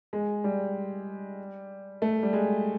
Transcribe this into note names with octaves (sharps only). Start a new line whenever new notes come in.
G#3
G3
A3
G3
G#3